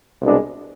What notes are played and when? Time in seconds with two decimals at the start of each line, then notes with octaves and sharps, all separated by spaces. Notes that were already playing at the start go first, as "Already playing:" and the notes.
0.22 C2 B2 G#3 D4